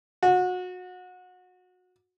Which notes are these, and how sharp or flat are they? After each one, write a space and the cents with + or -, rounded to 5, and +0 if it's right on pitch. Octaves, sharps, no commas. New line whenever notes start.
F#4 -25